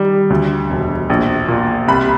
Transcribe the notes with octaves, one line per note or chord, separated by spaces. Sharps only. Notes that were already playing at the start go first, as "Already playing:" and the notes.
Already playing: D#3 G3
D2
E1
A#1
A#2
C2 B5